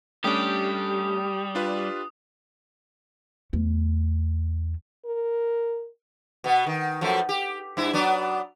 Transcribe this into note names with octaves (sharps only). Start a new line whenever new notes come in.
G3 A3 C#4 D4 G4 D#6
D4 F4 B4
E2 A3
A#4
B2 B3
D#3
F#2 F3 A3
G4
G2 E4
F#3 B3 D4